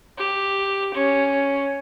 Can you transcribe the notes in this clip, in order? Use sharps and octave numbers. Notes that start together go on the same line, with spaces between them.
G4
C#4